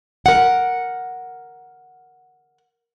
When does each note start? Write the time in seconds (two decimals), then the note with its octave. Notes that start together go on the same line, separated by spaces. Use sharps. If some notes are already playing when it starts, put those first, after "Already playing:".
0.26 A#4 F#5